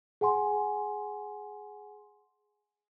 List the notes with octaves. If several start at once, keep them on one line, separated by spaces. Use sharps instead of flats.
G#4 F#5 G#5 C6